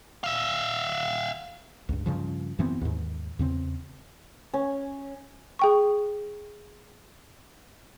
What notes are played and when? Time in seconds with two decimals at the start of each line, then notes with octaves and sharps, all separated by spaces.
0.24 E5 F5
1.89 C#2 G2
2.06 G2 C#3 F3
2.59 F#2 E3 B3 C4
2.81 D#2 G#2
3.39 E2 C#3 C4
4.54 C#4
5.59 G#4 G5 C#6